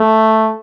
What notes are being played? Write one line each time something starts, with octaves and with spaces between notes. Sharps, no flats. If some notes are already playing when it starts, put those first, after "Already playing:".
Already playing: A3